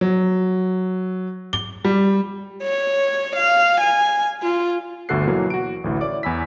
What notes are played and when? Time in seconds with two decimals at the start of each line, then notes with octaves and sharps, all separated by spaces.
0.01 F#3
1.53 G7
1.84 G3
2.63 C#5
3.36 F5
3.80 G#5
4.43 F4
5.09 G1 D2 F#4 A4 F#6 C7
5.28 B2 E3 F#3 A#3
5.50 F#4 D7
5.84 A1 D2 E3
6.01 C#5 D5 E5 D6
6.23 E2 G#5 B5 E6 B6